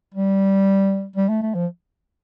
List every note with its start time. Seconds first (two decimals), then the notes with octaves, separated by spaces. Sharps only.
0.14 G3
1.16 G3
1.29 A3
1.42 A3
1.55 F3